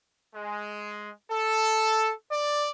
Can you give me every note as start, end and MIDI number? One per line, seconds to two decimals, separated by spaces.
0.35 1.10 56
1.31 2.13 69
2.30 2.68 74